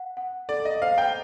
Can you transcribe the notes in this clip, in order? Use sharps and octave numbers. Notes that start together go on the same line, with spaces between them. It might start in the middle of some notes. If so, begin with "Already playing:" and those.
Already playing: F#5
F#5
A4 D5
D#5
C5 F5
G5